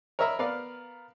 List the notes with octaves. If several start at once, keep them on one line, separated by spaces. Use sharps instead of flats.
A#4 C#5 D#5 E5 A#5 B5
B3 A#4 B4 D5 F5